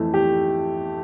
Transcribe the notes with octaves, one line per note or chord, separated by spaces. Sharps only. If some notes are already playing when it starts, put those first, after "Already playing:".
Already playing: F2 E3 A3
G4